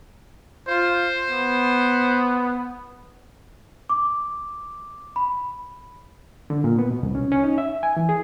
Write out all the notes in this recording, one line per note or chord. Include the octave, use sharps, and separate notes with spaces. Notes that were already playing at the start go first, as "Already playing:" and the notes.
F4 C5
B3
D6
B5
D3
A#2
B3
B2
C2
C#4
C#4
D#4
E5
G#5
E3
G#4